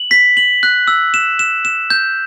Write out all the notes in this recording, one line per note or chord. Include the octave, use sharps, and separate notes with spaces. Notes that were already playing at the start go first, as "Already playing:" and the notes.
Already playing: F#7
B6
F#7
F#6
E6
E7
E7
E7
G6